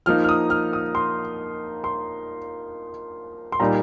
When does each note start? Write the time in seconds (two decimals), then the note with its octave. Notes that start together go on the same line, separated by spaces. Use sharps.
0.06 F3 A#3 D#4 F6
0.24 F6
0.29 D#6
0.50 F6
0.73 D#6
0.95 C6
1.84 C6
3.52 C6
3.60 A#2 G3 A#3 D#4 A#5